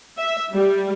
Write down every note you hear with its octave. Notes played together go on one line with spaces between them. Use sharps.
E5
G3